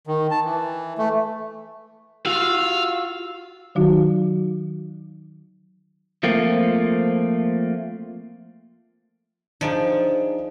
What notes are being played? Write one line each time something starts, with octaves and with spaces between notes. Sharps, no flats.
D#3
A5
E3
A3
F4 F#4 F5 E6
D#3 F#3 D#4 F#4
F3 A3 A#3 C4
F3 D4 D#4 G#4